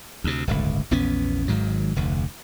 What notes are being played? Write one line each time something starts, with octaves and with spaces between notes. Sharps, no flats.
D2 C3
D1 G1 C#2
A#1 E2 B3 C#4
G#1 G#2 D#3 F#3
F1 D2